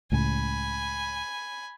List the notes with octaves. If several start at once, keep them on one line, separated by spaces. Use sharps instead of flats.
C#2 A2 C#3 G#5 B5